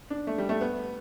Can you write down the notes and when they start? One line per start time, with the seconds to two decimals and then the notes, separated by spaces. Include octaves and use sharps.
0.10 D4
0.27 A3
0.38 G3
0.49 A3
0.61 B3